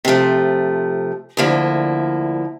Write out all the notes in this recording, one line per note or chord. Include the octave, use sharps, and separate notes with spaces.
C3 F3 A3
D2 D3 F3 A#3 E4